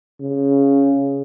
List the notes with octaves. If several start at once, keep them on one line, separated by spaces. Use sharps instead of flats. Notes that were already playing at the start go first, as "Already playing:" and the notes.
C#3